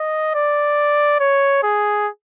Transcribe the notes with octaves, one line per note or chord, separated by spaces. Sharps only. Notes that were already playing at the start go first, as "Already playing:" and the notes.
Already playing: D#5
D5
C#5
G#4